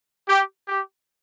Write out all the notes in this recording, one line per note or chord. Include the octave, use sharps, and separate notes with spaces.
G4
G4